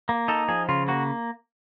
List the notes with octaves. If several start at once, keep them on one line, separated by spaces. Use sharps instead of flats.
A#3
D#4 A4
F3 G#4
C#3 F4
A#3 F#4